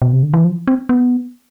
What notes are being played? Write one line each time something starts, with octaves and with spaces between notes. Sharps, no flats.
B2
C3
D3
E3
F3
C4
B3